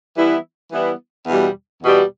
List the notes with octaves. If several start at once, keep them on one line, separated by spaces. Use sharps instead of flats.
E3 G3 B3 E4
E3 G3 B3 E4
E2 B2 G3
E2 B2 G3